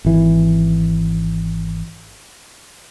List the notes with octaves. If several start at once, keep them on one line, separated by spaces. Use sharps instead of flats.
G#1 E3